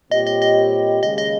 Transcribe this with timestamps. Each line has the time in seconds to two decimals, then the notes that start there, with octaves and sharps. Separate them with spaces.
0.10 A#2 G3 C4 G4 C#5 D#5
0.27 D#5
0.42 D#5
1.02 D#2 C#3 G#3 D#5
1.18 D#5